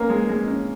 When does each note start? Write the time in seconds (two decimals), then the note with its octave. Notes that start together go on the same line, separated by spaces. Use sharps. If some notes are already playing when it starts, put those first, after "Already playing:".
Already playing: A#3 C#4
0.10 G#3
0.29 G#3
0.48 C#4